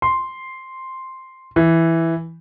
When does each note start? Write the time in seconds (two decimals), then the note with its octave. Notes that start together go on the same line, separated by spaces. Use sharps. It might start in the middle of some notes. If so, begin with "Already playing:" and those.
0.02 C6
1.56 E3